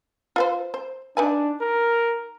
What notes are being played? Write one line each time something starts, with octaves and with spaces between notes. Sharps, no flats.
F4 B4 C5
C5
D4 D#4 B4 G#5
A#4